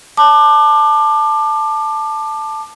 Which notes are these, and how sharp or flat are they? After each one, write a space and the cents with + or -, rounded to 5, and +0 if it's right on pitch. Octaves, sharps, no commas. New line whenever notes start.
A5 +0 D6 +25